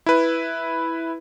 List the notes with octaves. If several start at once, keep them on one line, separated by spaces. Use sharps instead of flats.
E4 B4